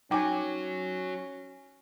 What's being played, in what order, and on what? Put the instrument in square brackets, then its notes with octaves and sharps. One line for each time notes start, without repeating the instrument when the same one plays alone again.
[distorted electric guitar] F#3 F#4 [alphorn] C#4 [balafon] D#4 D6 [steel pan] G5 G#5